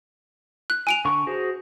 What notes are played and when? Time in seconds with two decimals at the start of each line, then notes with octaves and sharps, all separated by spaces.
0.70 F#6
0.87 G#5 D7 F7
1.05 D3 C#6
1.27 F#4 G#4 C5